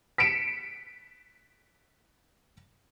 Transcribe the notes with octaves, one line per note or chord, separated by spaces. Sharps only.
B6 C#7 D7 E7